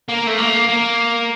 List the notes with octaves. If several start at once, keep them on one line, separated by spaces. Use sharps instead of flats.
A#3
A3
A#3
A#3